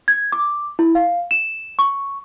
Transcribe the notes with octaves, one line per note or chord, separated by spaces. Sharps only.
G#6
D6
E4
F5
E7
C#6